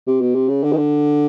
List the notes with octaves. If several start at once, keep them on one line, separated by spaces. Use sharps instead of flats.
C3
B2
C3
C#3
D3
D#3
D3